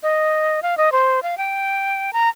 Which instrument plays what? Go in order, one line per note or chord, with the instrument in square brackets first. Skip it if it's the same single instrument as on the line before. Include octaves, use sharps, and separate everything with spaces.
[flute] D#5
F5
D#5
C5
F5
G5
A#5